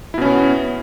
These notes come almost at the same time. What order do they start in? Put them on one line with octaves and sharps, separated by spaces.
E4 B2 C#4 B3